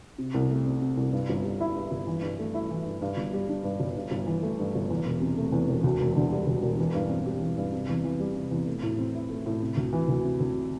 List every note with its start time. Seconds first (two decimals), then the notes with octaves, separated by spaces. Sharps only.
0.18 C3
0.34 C2
0.50 A3
0.66 C4
0.82 C3
0.97 C2
1.12 G2
1.29 G1
1.44 G3
1.60 E4
1.75 G2
1.91 G1
2.07 E3
2.22 G2
2.39 A3
2.54 E4
2.71 E3
2.86 G2
3.01 G2
3.17 G1
3.33 G3
3.49 D4
3.64 G2
3.80 G1
3.96 G2
4.11 G1
4.27 E3
4.43 A3
4.59 G2
4.75 G1
4.90 E2
5.05 E1
5.21 C3
5.37 A3
5.52 E2
5.68 E1
5.84 D2
6.00 E1
6.16 D3
6.31 G3
6.47 D2
6.62 E1
6.79 E3
6.94 G2
7.10 C4
7.26 G4
7.41 E3
7.57 G2
7.72 C3
7.89 E2
8.04 E3
8.20 G3
8.36 C3
8.51 E2
8.67 A3
8.83 A2
8.99 C4
9.15 E4
9.30 A3
9.46 A2
9.62 C3
9.77 D2
9.93 E3
10.08 D2
10.24 C3
10.40 D2